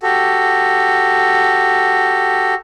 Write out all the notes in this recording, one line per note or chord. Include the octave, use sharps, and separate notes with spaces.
F#4 G4 A4